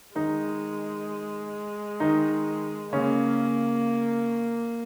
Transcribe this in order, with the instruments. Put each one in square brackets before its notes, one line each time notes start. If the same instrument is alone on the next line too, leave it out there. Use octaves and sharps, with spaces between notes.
[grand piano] D#3 D#4 [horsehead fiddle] G#3
[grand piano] D#3 D#4
[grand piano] C#3 C#4 [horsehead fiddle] A#3